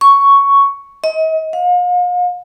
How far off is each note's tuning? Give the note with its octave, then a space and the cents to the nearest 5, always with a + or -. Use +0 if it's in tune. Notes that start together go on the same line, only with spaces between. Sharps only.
C#6 +5
D#5 +35
F5 +40